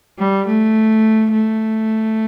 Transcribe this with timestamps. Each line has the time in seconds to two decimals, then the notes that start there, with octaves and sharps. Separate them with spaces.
0.18 G3
0.47 A3
1.31 A3